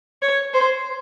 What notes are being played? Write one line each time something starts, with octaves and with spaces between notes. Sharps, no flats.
C#5
C5